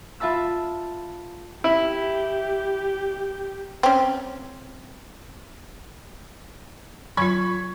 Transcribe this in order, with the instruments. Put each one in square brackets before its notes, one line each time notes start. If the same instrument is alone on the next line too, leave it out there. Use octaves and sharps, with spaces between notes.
[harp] F4 E5 A5 B5 E6
[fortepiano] E4 [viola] G4
[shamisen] C4 C#4
[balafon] F#3 F4 [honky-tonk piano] B5 C#6 G#6